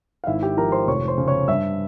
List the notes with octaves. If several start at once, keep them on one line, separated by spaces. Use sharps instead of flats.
F5
G#1 E4 E5
G4 G5
F3 A#4 A#5
C5 C6
F1 C#5 C#6
C5 C6
C#3
C#5 C#6
G2 E5 E6